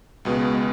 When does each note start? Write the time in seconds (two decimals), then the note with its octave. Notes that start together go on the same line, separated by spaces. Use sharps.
0.25 C#2 B2 G#3 B3